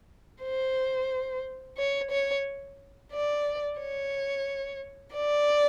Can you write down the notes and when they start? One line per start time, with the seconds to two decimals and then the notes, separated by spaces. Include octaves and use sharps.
0.43 C5
1.78 C#5
2.11 C#5
3.12 D5
3.80 C#5
5.15 D5